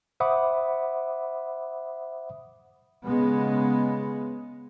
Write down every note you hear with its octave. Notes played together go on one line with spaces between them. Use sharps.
C5 E5 F#5 B5 D6 D#6
C#3 G#3 B3